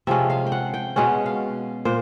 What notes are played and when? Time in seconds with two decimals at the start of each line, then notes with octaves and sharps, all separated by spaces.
0.07 C3 F3 G#3 C#4 E5
0.30 F5
0.47 G5
0.52 F#5
0.74 G5
0.96 B2 G#3 C#4 F#5
1.26 F5
1.85 A#2 C5